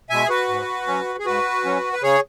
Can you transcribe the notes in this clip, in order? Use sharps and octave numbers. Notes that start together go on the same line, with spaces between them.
B2 G#3 E5 G#5
G#4
F#4 B4
G#2
F#3 C#4
G#4
G#2 F#4 B4
F#3 C#4
B4
C#3 G#4 C#5